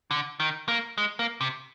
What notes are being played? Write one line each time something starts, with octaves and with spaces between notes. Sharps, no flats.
D3
D#3
A#3
G#3
A#3
C3